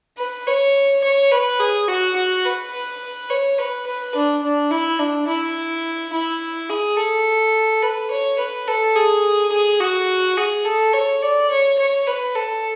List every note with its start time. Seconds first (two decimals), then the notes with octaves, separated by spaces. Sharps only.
0.18 B4
0.46 C#5
1.04 C#5
1.31 B4
1.60 G#4
1.88 F#4
2.16 F#4
2.45 B4
3.30 C#5
3.58 B4
3.87 B4
4.15 D4
4.43 D4
4.71 E4
4.99 D4
5.28 E4
6.13 E4
6.70 G#4
6.98 A4
7.82 B4
8.11 C#5
8.39 B4
8.68 A4
8.96 G#4
9.52 G#4
9.81 F#4
10.37 G#4
10.65 A4
10.93 C#5
11.22 D5
11.51 C#5
11.79 C#5
12.07 B4
12.35 A4